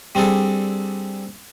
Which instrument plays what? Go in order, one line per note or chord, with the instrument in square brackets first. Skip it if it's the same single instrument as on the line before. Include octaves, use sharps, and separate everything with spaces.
[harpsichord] G3 C4 D4 G#4 A4